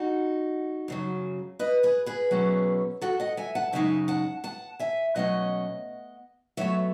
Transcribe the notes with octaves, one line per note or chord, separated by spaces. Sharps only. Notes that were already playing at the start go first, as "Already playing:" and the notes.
Already playing: D#4 F#4
F#2 C#3 F#3
B4 D#5
G#4 B4
G#4 B4
B2 F#3 A3 C#4
F#4 A4
D#5 F#5
E5 G#5
F#5 A5
F#2 C#3 G#3 D#4 E5 G#5
F#5 A5
F#5 A5
E5 G#5
B2 F#3 A3 C#4 D#5 F#5
B2 F#3 A3 C#5 E5